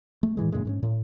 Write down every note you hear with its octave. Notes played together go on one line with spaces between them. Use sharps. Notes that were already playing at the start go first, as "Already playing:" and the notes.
A3
A2 D#3 E3 G#3
F#2 A#2 D3 G#3
G#2 A3 C#4
A2